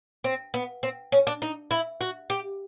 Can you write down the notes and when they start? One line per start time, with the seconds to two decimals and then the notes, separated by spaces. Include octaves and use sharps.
0.24 C4
0.54 B3
0.83 C4
1.12 C#4
1.27 D4
1.42 D#4
1.71 E4
2.01 F#4
2.30 G4